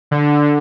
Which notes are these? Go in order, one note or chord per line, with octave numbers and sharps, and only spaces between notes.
D3